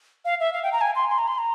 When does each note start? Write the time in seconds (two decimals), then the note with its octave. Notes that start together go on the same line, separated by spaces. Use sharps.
0.25 F5
0.40 E5
0.53 F5
0.63 G5
0.72 A#5
0.81 G#5
0.96 C6
1.09 C6
1.18 A#5
1.28 C6
1.38 A#5